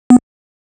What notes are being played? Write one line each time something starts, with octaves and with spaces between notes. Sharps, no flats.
B3